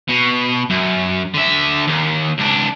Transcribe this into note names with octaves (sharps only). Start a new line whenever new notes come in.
B2
F#2
D3 E5
D#2
C#2 D4